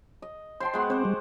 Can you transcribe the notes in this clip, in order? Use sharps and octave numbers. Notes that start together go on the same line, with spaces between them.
D#5
C5 G5 A5 C6
G#3 B3 F#4
C4 C5 D6
G3